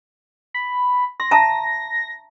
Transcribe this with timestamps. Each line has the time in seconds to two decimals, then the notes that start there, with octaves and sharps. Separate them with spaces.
0.54 B5
1.20 C6 A#6
1.31 E5 A5 A#5